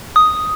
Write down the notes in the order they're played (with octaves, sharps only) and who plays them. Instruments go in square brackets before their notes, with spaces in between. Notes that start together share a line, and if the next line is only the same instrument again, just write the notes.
[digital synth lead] D#6